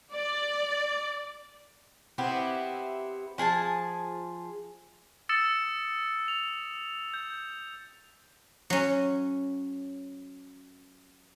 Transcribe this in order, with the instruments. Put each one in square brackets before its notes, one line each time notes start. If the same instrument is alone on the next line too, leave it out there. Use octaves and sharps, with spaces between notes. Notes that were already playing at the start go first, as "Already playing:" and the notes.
[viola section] D5
[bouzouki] B3 C4 E4 G4
F3 G#4 G#5 A5
[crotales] D#6 E6 A6 C#7 E7
F7
G6
[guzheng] F#3 C#4